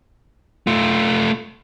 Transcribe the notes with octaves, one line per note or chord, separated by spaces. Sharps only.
A3 F4